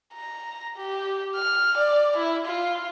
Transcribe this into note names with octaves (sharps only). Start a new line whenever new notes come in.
A#5
G4
F6
D5
E4
F4